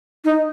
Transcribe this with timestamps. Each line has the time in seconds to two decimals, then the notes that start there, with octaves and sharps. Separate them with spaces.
0.25 D#4